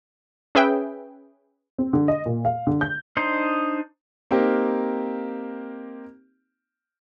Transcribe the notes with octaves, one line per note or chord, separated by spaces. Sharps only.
C#4 G#4 B4 E5 G5
C4
D3
D#5
A#2
F5
D3
G6
D4 D#4 C5
A#3 C4 D#4 G4 A#4